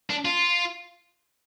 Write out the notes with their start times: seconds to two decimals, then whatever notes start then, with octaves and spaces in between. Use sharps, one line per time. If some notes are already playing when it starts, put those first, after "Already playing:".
0.10 D4
0.25 F4